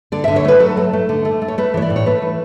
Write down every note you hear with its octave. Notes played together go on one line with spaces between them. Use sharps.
D3 D5
D3 E5
C#5
A3 B4
F#3 A4
A3
A3
D3
A3
A3
C#5
A3 B4
E3 C#5
D5
A2
C#5
A3 B4
E3